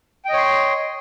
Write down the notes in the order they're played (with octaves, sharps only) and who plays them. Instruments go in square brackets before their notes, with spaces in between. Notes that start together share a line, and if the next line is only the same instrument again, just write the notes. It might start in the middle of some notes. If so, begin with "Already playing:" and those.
[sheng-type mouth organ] G5
D#5
C#5
C6